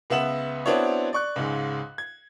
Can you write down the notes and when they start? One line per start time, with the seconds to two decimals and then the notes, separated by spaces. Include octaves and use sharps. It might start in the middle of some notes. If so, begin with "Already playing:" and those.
0.10 C#2 B3 E5 F#5 E7 F#7
0.66 B3 C4 D4 E4 F#4 C#5
1.13 D5 C#6 F#6
1.36 C#2 G#2 C#3
1.98 G#6